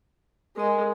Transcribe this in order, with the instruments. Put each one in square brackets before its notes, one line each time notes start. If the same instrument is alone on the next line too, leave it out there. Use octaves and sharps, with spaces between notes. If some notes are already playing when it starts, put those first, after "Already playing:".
[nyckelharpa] G#3 [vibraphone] A#4 D#5